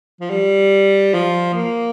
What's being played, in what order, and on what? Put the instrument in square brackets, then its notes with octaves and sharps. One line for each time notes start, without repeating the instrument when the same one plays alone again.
[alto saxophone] F3
G3
F3
A#3